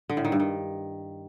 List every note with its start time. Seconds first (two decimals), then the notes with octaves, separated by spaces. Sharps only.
0.09 D3
0.17 A2
0.25 D#3
0.32 G2
0.40 D#3